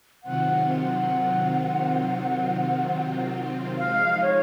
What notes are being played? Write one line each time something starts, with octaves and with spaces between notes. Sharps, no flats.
C3 D#3 F#3 C4 F4 F#5
F3 G#3 D#4 F5
C#5